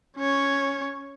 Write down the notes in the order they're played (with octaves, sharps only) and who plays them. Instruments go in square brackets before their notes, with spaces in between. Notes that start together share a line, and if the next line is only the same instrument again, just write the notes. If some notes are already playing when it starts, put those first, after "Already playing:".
[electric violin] C#4 C#5